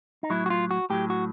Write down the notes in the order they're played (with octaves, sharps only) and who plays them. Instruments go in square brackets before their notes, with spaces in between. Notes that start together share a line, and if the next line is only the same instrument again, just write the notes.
[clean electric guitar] D#4
A2 F#3 E4
F#4
F4
F#4
A2 F#3 G4
F#4